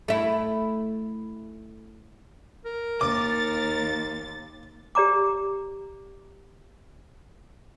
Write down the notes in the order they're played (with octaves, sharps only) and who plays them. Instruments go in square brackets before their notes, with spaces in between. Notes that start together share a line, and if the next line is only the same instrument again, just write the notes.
[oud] A3 E4
[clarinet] A#4
[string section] D#2 A6 [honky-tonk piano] D6
[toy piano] G4 D5 A#5 D6